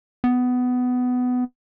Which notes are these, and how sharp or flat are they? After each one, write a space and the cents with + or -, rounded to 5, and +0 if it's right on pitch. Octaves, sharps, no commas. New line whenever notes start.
B3 +15